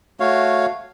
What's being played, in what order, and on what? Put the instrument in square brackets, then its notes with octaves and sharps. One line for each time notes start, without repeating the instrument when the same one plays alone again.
[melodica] A3 F#4 C#5 F5